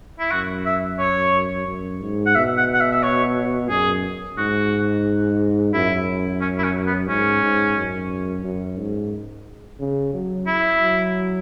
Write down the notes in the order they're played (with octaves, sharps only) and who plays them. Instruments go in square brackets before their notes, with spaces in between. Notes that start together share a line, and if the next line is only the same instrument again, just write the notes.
[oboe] E4
[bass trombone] F#2 [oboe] F#4
[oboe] E5
C#5
[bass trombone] F#2
G#2
[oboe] F#5
[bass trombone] B2 [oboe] E5
[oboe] F#5
F#5
E5
E5
C#5
[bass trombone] F#2 [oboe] G#4
[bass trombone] G#2 [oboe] F#4
[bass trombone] F#2 [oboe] E4
[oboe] C#4
E4
C#4
B3
[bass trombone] G#2 [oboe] C#4
[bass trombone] G#2
F#2
F#2
G#2
C#3
F#3
[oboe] E4
[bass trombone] F#3